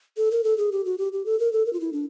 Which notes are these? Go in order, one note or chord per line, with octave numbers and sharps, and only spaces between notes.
A4
A#4
A4
G#4
G4
F#4
G4
G4
A4
A#4
A4
A#4
F4
E4
D4